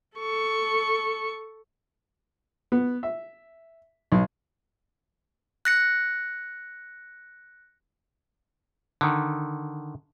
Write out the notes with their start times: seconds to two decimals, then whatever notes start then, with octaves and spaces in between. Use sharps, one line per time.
0.16 A4 C#6
2.72 B3
3.03 E5
4.12 B1
5.65 F#6 A#6 C#7
9.01 D3 D#3